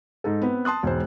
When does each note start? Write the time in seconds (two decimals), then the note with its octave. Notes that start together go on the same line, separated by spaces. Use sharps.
0.24 G#2 D#4 A4
0.42 B3 C4 B4
0.65 A5 C6 D#6 F#6
0.83 E1 G#2 C5